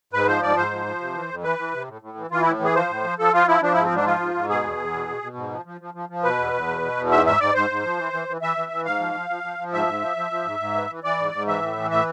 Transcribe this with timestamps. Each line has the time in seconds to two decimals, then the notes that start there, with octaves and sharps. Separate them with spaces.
0.13 G#2 B4
0.27 F3 C5
0.42 G#2 D5
0.56 G#2 C5
0.71 F3
0.86 F3
1.00 C3
1.14 E3
1.29 F2
1.43 E3 B4
1.58 E3
1.74 C3
1.88 A2
2.02 A2
2.17 E3
2.31 E3 F4
2.42 A2 E4
2.60 E3 G#4
2.75 F3 C5
2.89 A2
3.04 F3
3.19 F3 A4
3.33 F3 F4
3.47 F3 E4
3.62 F3 D4
3.73 G#2 E4
3.84 C4
3.91 G#2 D4
4.06 F3 F4
4.20 G#2
4.34 G#2
4.49 B2 G#4
4.64 E2
4.78 E2
4.93 B2
5.08 B2
5.22 B2
5.36 G#2
5.51 F3
5.65 F3
5.81 F3
5.94 F3
6.09 F3
6.23 B2 B4
6.39 E2
6.53 E2
6.67 B2
6.81 B2
6.97 E2
7.11 G#2 E5
7.25 G#2 E5
7.40 G#2 D5
7.54 G#2 C5
7.70 G#2
7.84 F3
7.98 E3
8.13 E3
8.28 E3
8.41 E3 E5
8.57 E3
8.72 E3
8.85 G#2 F5
9.00 F3
9.14 F3
9.30 F3
9.43 F3
9.59 F3
9.73 G#2 E5
9.87 G#2
10.02 F3
10.17 F3
10.31 F3
10.45 G#2
10.60 G#2
10.75 E3
10.89 E3
11.04 E3 D5
11.19 G#2
11.33 G#2
11.47 E3 E5
11.61 A2
11.77 E3
11.90 A2 E5